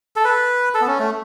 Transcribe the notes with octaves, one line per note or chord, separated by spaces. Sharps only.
A4
B4
A4
B3
C#4
A3